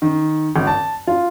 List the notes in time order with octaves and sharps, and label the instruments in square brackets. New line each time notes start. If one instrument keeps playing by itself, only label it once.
[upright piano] D#3
G#1
A5
F4